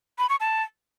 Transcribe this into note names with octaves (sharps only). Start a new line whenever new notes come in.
B5
C#6
A5